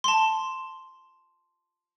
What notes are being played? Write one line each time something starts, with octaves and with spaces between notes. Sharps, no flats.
A5 C6